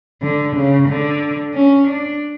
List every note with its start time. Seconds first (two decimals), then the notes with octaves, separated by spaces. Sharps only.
0.22 D3
0.56 C#3
0.88 D3
1.54 C#4
1.88 D4